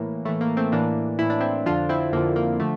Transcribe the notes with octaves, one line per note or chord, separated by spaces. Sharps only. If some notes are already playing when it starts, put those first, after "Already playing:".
Already playing: A2 E3 A#3
A2 E3 A3
A#3
A3 C4
A2 E3 A#3 D4
A2 E3 E4
D4
C4 E4
F2 D3 F3 D4 F4
C4 E4
F2 D3 F3 A#3
A#3
D3 F3 A3